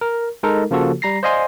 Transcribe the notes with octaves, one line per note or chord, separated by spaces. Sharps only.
A#4
G#3 D#4 A4 A#4
C#3 F3 A#3 F4 F#4 A4
G3 A#5 A#6 C7
C5 D5 D#5 F5 G#5 C6